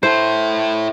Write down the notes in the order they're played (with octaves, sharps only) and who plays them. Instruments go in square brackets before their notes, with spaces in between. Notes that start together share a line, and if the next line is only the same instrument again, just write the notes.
[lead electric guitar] E4 A4 [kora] C5